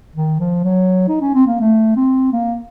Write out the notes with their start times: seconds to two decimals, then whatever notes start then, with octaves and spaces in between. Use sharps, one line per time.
0.16 D#3
0.40 F3
0.64 F#3
1.08 D#4
1.21 C#4
1.34 C4
1.47 A#3
1.61 A3
1.96 C4
2.33 A#3